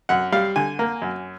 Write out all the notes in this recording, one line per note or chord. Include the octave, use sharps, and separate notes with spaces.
F#2 F#5
G3 F5
D3 G#5
A#3
F#2